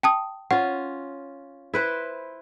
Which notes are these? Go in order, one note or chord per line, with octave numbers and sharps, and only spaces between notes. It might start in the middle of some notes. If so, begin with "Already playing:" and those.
G5 A5 D#6
C#4 F4 F#5
E4 B4 C5